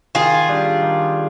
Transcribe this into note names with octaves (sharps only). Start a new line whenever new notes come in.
D#3 F4 G#4
G3 D4 G4
D#3